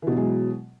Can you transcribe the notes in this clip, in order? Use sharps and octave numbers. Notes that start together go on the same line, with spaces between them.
B2 E3 F#3 G#3